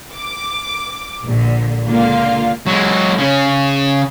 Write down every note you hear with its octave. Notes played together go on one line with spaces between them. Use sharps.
D6
A#1 A#2 D3
C#2 D3 A#3 F4 F5
F#3 G#3
C#3 C#4